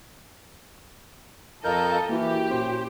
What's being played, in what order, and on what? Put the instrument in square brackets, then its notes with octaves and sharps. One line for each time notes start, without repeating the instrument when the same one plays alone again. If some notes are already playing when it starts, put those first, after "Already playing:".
[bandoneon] F2 A#4 G6 [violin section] A4 D#5 [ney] F5
[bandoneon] E3 [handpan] A#3 E4 [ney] F#4 [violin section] G4
[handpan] A#2 C#4 [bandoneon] C5